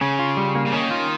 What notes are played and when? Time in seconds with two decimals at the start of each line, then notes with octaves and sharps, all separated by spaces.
0.01 C#3 C#4
0.19 F4
0.37 G3
0.55 A#3
0.66 C#3
0.73 D#3 C#4
0.91 F4